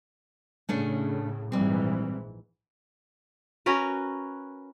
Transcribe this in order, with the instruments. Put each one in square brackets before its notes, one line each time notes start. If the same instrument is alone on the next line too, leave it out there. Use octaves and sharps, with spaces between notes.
[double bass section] A2 C#3 [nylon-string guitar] A3 C#4 D4
[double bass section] A#1 G#2 E3 [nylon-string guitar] G3 C4
[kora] C#4 F#4 A#4 B4